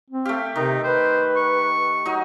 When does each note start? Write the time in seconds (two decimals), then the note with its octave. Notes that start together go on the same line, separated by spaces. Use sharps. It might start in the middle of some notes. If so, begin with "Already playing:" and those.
0.10 C4
0.25 A3 G4 F5
0.56 C3 D#3 D#4
0.84 B4 C5
1.36 C#6
2.05 F#3 D#4